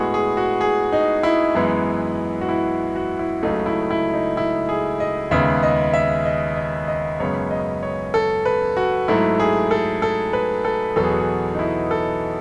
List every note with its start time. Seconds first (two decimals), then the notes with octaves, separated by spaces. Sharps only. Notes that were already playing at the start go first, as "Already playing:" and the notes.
Already playing: A2 G#3 B3 F#4 G#4
0.14 G#4
0.37 F#4
0.61 G#4
0.93 D#4
1.23 E4
1.55 F#2 E3 G#3 B3
2.41 F#4
2.49 E4
2.96 F#4
3.19 E4
3.43 C#2 C#3 F#3 A3 D#4
3.66 E4
3.91 E4
4.14 D#4
4.37 E4
4.69 G#4
5.00 D#5
5.31 D#2 C#3 G#3 B3 E5
5.63 D#5
5.94 E5
6.25 D#5
6.57 D#5
6.88 D#5
7.20 F#2 C#3 G#3 B3 C#5
7.51 D#5
7.83 C#5
8.14 A4
8.45 B4
8.77 F#4
9.08 G#2 F#3 A3 E4
9.40 G#4
9.71 A4
10.02 A4
10.33 B4
10.65 A4
10.96 E2 B2 F#3 B3 A4
11.04 G#4
11.11 F#4
11.19 G#4
11.55 D#4
11.59 E4
11.91 A4